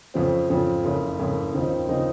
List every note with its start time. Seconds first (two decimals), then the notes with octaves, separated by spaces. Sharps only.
0.14 F2 C#3 F3 C4
0.49 F2 C#3 F3 C4
0.84 F#1 F2 C#3
1.19 F#1 F2 C#3
1.54 D#2 C#3 F3 C4 D#4
1.88 C#3 F3 C4 D#4